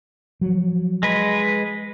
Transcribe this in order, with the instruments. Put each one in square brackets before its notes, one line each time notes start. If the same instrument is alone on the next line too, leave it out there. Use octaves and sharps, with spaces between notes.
[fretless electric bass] F3 F#3
[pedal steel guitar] G#3 B4